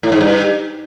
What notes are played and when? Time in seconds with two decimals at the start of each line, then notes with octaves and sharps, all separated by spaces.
0.03 A2
0.12 G#2
0.21 G2